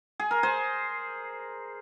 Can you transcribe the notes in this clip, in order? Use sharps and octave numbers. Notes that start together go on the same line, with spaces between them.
G#4
A#4
G#4 C5